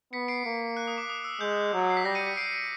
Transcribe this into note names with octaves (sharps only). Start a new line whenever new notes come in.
B3 B6 C#7
C7 D7
A#3
F#6
D#6
D6
D#6
E6
G#3 G6
F#3
C7
B6
G3 A#6
C#7 D#7
B6 C#7
C7 D7